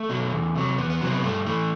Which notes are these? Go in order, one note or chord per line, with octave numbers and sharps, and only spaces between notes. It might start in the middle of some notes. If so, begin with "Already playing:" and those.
Already playing: A3
B2 F#3
E2
C3 F#3
E2 B3
B3
C3 F#3
C4
B3
G2 A3
E3 A3